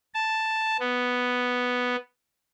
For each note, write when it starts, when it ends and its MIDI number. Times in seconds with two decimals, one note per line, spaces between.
0.14 0.77 81
0.80 1.96 59